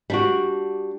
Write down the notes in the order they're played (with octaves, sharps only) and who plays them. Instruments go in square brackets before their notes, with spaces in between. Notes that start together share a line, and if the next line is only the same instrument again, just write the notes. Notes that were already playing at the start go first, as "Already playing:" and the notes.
[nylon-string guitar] G3 D4 F#4